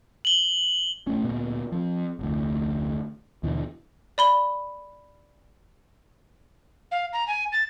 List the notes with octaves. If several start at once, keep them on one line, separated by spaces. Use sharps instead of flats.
F#7 G7
A#1 A3 C#4
D1 A#2 B3
F3 C4
F1 D2
D#2 B2 D3 E3
D5 B5 G7
F5
A#5
G#5
A6